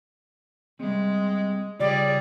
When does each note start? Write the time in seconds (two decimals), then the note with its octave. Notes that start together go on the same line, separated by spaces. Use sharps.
0.80 G3 G#3 C4
1.80 C#3 G3 F4 G#4 D5